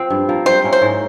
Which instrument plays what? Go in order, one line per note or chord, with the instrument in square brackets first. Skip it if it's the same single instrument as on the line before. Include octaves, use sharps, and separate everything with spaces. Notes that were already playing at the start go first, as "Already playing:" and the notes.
Already playing: [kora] C4 F4
G2
F3 A#3
[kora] G3 [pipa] C5
[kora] A#3 C#4 E4
[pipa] C5
[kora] G#2